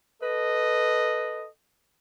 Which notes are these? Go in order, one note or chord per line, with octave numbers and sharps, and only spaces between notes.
A4 B4 D#5